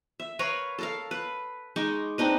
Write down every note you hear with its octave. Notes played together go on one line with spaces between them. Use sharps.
E5
A#4 B4 C#5 F5
A4 A#4 F5
B4
G#3 D#4 C#6 D6
C4 D4 D#4 B4